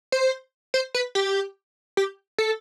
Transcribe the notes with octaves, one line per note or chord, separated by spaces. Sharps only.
C5
C5
B4
G4
G4
A4